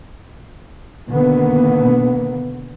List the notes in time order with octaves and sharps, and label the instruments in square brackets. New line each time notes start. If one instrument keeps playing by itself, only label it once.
[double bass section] B2 D3 D#3 A#3 B3